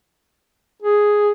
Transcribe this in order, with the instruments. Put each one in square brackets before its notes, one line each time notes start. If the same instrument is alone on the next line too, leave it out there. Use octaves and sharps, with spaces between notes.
[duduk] G#4